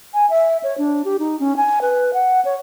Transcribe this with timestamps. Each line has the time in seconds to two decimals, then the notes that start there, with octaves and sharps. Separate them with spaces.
0.14 G#5
0.30 E5
0.63 C#5
0.78 D4
1.05 G4
1.19 D#4
1.40 C#4
1.56 G#5
1.81 B4
2.13 F#5
2.45 C#5